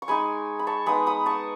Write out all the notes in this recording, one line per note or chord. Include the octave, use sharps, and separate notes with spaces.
C#6
G#3 D#4 G#5 B5
B5
A5 C#6
G#3 B3 D#4 B5 D#6
B5 D#6
A5 C#6